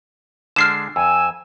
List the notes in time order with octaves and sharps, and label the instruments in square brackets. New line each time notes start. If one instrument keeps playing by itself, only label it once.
[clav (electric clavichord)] D3 G#3 D4 [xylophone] F6 C7 E7
[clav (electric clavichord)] F2 [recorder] G#5 [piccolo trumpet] E6